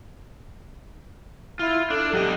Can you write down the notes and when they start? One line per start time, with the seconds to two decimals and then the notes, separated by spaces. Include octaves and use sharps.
1.59 E4 F4
1.90 D4 A4
2.13 F#3 G4 D#5